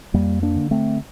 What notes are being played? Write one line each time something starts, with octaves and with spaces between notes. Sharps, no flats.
F2 G3 A#3
A#3 D4
D3
A3 C4